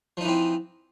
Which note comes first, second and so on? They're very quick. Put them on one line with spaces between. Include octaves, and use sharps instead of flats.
F3 D#4 E3 C4